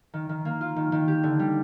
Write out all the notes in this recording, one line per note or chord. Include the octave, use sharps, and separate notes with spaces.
D#3
D#3
A#3
F4
D#3
D#3
G4
D3
G3